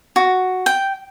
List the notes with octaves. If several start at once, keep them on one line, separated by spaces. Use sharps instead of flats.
F#4
G5